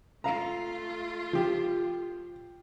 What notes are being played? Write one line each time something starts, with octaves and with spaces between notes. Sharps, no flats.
A3 F4 F5 A#5
F3 G4